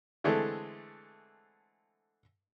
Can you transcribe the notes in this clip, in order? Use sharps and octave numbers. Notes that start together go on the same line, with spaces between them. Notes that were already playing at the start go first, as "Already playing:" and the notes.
D3 E3 G#3 A3 C4